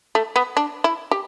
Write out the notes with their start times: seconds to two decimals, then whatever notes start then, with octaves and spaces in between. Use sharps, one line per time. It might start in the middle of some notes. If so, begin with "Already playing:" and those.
0.15 A3
0.36 B3
0.57 D4
0.84 E4
1.11 G4